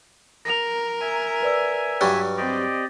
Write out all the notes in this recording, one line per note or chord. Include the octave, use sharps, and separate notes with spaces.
A#4 A#6 F7
E5 G#5 A#5
B4 D5 E6
G2 F#3 G3
C4 G4 D5 D#5